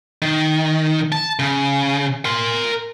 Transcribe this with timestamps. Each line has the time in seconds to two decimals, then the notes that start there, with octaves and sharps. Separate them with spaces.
0.22 D#3
1.12 A5
1.39 C#3
2.25 A#4 C6